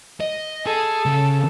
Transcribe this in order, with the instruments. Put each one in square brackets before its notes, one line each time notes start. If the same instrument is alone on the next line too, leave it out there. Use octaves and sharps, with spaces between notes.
[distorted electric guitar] D#5
[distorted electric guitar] G#4 [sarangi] A4
[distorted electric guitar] C#3